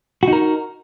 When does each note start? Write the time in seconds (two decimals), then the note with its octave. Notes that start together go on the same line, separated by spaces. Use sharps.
0.23 F#4
0.28 D#4
0.33 A#4